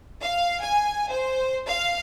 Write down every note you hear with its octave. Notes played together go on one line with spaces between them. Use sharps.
F5
G#5
C5
F5